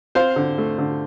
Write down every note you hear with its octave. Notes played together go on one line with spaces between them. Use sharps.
C4 C5 F5
D3
A3
D3